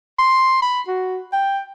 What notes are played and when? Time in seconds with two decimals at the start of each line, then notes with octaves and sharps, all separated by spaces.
0.19 C6
0.62 B5
0.88 F#4
1.33 G5